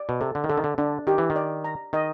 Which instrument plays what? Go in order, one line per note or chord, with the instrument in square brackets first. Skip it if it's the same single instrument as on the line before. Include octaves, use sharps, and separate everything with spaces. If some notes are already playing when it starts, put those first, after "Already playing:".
Already playing: [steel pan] D5
[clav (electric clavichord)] B2
[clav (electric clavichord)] C3 [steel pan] A4
[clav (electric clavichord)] D3
D#3
[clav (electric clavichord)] D3 [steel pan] A4
[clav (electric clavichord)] D#3
D3
[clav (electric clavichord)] D3 [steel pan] D4
[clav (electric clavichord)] D#3 [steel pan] G4
[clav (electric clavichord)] E3
D#3
[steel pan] D5
A#5
[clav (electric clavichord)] D#3 [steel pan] D#5